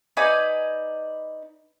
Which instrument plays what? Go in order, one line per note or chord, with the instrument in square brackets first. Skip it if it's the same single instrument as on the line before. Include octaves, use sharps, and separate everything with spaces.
[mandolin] D#4 B4 D5 G#5